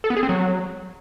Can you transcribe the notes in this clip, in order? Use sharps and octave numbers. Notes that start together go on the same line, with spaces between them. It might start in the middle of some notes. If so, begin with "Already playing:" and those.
A4
B3
G#4
C4
F#3